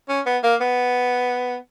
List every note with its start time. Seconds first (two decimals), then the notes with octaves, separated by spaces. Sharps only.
0.09 C#4
0.26 B3
0.44 A#3
0.61 B3